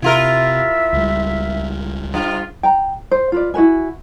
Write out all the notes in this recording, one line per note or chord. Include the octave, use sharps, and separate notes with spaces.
C3 E4 F4 A#4 E5
C#2 G3
G2 F4
G5 A#5
C5
F4 B4 D5
E4 F#4 B4 G#5